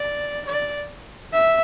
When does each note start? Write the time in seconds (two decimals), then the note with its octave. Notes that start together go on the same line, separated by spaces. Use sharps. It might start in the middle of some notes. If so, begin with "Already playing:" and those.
Already playing: D5
0.46 D5
1.34 E5